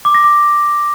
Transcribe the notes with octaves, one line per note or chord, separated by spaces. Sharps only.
D6
A#6
D6